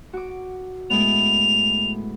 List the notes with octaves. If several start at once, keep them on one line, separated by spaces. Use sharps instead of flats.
F#4 D6
A2 G#3 B3 F7